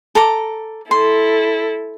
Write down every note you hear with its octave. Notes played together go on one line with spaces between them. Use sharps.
A4 A#5 D6
E4 A4 C6